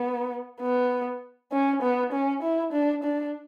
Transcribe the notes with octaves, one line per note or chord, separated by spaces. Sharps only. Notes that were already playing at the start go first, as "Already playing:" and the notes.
Already playing: B3
B3
C#4
B3
C#4
E4
D4
D4